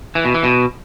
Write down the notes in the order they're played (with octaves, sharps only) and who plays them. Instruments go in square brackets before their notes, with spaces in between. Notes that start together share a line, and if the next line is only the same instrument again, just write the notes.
[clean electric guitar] E3
B2
E3
B2